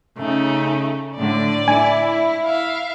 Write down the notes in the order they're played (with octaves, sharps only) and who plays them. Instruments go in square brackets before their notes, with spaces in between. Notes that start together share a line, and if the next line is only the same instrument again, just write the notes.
[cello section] C#3 [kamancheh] A3 D#4
[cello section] A2 D3 [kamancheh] D5
[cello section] E4 [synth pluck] G#5
[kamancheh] E5 F5